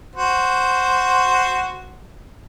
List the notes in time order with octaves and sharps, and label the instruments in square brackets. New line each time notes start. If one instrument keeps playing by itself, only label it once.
[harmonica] F#4 C5